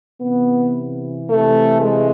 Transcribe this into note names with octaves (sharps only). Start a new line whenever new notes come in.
C3 E3 B3
C3 E3 A3
G#3